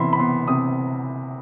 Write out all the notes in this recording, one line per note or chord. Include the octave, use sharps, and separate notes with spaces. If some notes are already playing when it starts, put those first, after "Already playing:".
Already playing: C3 E3 E5 B5 C6
B5
B3 C6
C3 D#6